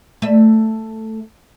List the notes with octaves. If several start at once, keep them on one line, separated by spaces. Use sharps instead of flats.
A3 E5